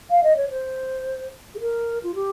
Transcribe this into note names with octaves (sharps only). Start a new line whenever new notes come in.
F5
D#5
C#5
C5
G#4
A#4
F4
G4